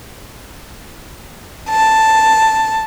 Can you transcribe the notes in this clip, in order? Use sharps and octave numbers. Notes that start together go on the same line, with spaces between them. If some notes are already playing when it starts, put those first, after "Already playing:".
A5